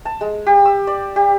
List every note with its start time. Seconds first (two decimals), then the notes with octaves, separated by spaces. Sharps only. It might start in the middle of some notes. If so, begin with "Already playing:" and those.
0.05 A5
0.21 G#3
0.46 G4
0.65 E6
0.87 D5
1.16 G4